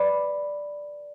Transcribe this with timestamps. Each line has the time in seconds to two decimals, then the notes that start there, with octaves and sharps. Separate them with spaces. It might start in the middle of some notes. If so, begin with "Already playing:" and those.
Already playing: B4 D5